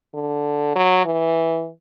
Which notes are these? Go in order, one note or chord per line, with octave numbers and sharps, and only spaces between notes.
D3
F#3
E3